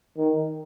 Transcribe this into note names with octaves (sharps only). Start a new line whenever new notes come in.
D#3